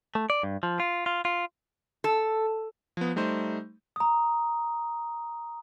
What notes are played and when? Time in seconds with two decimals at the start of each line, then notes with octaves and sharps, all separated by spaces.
0.15 A3
0.30 D5
0.43 G2
0.63 F3
0.80 F4
1.06 F4
1.25 F4
2.04 A4
2.97 F3 B3
3.16 G3 A3 D#4 C5
3.96 A#5 D#6